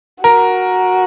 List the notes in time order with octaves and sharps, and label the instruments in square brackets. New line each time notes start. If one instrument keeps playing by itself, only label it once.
[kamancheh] F#4 [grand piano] A#4